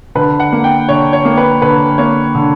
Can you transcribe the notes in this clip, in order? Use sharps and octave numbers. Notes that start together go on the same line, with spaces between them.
D3 B4
F#5
A#3
G5
D3 C#5
C#5
A#3
B4
D3 B4
A#3 C#5
D3